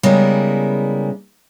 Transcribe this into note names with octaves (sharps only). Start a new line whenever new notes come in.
C#3 G3 G#3 B3 E4 A#4